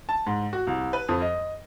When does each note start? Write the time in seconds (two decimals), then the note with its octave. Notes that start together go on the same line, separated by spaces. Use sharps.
0.09 A5
0.27 G#2
0.53 F#4
0.67 C2
0.93 B4
1.09 F2
1.22 D#5